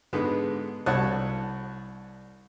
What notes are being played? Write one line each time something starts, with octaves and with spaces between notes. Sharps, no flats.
G#2 D3 G#3 B3
C2 C#5 F#5 A5 F#6